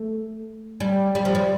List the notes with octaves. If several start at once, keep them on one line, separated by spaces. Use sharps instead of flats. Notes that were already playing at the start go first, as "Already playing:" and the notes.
Already playing: A3
G3
G3
F3
G3